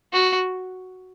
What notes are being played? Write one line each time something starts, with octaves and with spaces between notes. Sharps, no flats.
F#4